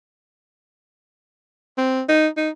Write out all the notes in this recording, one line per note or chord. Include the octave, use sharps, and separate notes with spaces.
C4
D#4
D#4